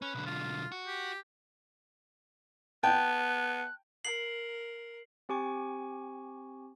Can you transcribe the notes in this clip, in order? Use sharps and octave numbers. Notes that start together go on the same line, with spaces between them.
C#4 B4
B1 D3
F4
F#4
G4
B3 G5 A5 F#6
A#4 C7 F#7
C4 G4 G#5 C#6